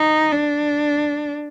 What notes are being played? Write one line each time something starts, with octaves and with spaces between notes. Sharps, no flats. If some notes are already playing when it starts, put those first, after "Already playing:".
Already playing: D#4
D4